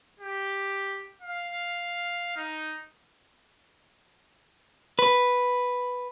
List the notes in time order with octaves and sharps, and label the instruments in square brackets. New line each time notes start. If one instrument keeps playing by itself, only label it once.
[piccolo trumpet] G4
F5
D#4
[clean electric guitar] B4